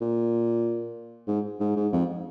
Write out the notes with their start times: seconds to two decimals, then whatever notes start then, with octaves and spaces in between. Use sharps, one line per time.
0.01 A#2
1.27 G#2
1.60 G#2
1.76 G#2
1.92 F2